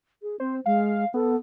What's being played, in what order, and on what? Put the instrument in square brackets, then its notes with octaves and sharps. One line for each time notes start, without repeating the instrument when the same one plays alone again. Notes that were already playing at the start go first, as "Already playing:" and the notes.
[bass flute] G#4
[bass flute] C4 [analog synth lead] C5
[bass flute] G#3 [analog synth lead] F5
[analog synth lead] B3 [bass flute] A4